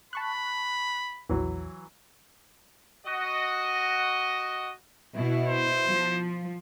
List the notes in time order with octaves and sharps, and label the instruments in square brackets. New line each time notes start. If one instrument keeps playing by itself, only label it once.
[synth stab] A5 C#6 F#6 [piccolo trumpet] B5
[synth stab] A#1 E2 [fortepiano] E3 F#3
[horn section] F#4 D#5
[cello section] B2 E4
[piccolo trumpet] C5
[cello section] F3